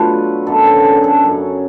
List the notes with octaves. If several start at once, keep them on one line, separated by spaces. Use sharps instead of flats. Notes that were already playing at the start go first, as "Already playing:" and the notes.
Already playing: B2 F#3 A3 D4 F4 A4 B4
F#2 D3 F#3 B3 A4
A4
G#4
A4
F#2 C#3 F#3